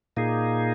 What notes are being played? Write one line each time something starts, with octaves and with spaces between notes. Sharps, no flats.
A#2 A#3 D#4 G#4